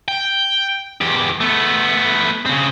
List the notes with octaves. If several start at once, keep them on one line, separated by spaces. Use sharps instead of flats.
G5
E2 G4
A3 B3
C#3 C4